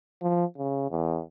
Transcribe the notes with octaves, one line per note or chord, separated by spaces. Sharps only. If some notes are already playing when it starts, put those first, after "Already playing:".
F3
C#3
E2